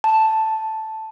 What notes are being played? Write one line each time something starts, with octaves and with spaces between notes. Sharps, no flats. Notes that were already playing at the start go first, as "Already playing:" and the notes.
A5